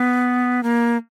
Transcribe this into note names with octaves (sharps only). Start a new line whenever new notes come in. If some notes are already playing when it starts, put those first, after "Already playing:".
Already playing: B3
A#3